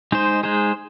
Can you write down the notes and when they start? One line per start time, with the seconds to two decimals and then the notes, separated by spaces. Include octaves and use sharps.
0.12 G#3 D#4 G#4 C5
0.43 G#3 D#4 G#4 C5